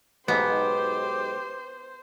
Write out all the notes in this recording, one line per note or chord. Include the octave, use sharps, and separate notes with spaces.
B1 G#2 B3 G4 C5